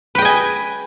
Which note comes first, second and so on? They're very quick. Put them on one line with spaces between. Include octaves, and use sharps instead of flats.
B4 G5 D#5 G#5